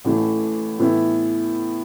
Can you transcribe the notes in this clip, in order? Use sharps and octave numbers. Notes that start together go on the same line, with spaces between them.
A1 A2 E3 A3
A2 E3 B3 E4